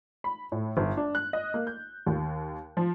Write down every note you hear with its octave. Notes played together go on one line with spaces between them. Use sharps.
B5
A2
G1
D4
F#6
D#5
A#3
G6
D#2
F3